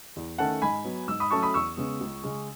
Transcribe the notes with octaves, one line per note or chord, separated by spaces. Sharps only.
E2
D#3 A3 C#4 F#5 A5
G#2 G#5 B5
F#3 B3
G#2 E6
B5 D#6
F#3 A3 C#4 A5 C#6
B5 D#6
E2 C#6 E6
C#3 G#3 B3
C#2
C#3 G#3 C#4